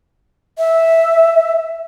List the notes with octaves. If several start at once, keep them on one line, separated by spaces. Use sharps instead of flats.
E5